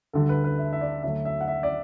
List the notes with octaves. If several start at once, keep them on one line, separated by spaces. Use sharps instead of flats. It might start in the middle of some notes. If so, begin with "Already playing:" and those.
D2 D3 G3 A4
B4
B4
E5
E5
D5
D2 D3 F#3 A3 E5
E5
F#5
E5
D5